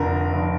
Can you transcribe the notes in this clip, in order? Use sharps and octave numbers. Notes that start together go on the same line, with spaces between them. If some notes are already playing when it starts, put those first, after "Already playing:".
Already playing: F1 F2 D3 A#4
F1